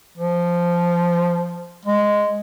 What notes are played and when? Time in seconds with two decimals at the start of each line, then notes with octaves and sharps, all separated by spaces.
0.17 F3
1.85 G#3